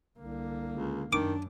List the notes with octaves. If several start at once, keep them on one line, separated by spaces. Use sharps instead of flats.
C2 D3 A#3
C#2
F#2 D#3 D4 D6